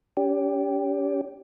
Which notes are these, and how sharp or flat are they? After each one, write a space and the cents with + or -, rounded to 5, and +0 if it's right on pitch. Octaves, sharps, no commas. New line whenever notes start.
C#4 +40 G4 +0